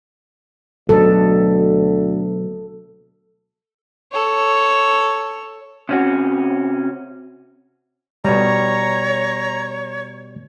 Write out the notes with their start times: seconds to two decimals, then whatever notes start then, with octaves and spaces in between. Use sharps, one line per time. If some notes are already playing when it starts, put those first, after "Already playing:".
0.89 D2 B2 F#3 B3 A4
4.12 A4 C#5
5.89 C3 C#4 F#4
8.24 B2 G3 C#5 A#5